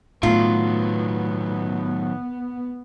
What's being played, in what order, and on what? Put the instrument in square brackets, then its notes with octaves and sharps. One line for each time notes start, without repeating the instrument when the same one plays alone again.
[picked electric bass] A2 [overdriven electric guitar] D#3 F#3 [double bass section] B3 [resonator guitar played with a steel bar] F4